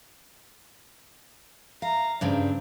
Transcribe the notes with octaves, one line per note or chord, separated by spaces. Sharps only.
F5 A#5
G2 C#3 C4 D4